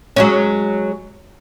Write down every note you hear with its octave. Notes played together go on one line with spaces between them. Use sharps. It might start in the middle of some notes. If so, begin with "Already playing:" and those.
F#3 G#3 C#4